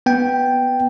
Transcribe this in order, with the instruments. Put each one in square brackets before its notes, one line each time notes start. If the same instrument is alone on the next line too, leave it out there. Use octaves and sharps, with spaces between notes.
[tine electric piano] B3 G5